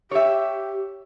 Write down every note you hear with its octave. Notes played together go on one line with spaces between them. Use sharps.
G4 C#5 E5